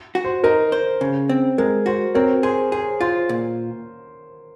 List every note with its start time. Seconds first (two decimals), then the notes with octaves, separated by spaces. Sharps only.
0.15 F#4
0.24 C5
0.44 D#4 A#4
0.72 C5
1.01 C#3
1.29 C4
1.58 G#3 A#4
1.86 F#4 C5
2.15 C4 A#4 C#5
2.43 G#4 C5
2.72 G#4 C5
3.01 F4 C5
3.29 A#2